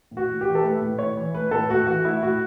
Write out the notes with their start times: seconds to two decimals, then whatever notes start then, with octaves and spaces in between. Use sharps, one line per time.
0.11 A2
0.17 F#4
0.29 A2
0.41 E3 G4
0.55 A4
0.63 A3 B4
0.81 A2
0.99 A2 C#5
1.17 E3
1.34 A3 B4
1.51 A2 A4
1.70 A2 F#4
1.87 E3 F#4
2.05 A3 E4
2.22 A2 F#4